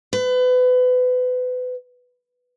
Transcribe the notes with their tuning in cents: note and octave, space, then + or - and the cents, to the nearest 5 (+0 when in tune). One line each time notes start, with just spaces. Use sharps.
B4 +30